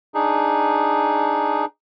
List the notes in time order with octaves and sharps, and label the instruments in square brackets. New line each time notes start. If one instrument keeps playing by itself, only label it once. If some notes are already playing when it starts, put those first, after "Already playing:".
[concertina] D4 D#4 G#4